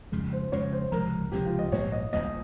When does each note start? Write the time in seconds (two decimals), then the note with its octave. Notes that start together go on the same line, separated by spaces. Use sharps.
0.12 F2 C#3 G#3
0.33 C5
0.52 F2 C#3 G#3 C#5
0.72 C5
0.92 C#2 C3 F3 G#3 A#4
1.32 C#2 C3 F3 G#3 G4
1.46 F4
1.59 D#5
1.72 A#1 G#2 G3 A#3 C#5
1.92 D#5
2.13 A#1 G#2 G3 A#3 D#5